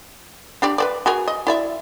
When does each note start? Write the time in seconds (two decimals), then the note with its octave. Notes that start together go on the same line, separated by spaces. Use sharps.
0.62 D4 G4 D5
0.78 B4 C5 D5
1.06 F#4 G#4 A#4
1.28 D#5
1.47 E4 D5 E5